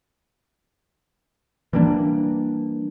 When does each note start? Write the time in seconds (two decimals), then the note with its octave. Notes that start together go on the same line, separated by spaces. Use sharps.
1.73 E3 G3 A#3 D4